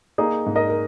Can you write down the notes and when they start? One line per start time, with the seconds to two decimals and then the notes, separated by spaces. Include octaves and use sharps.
0.18 A#3 D#4 G#4
0.46 G#2
0.55 A#4 D#5
0.69 A#4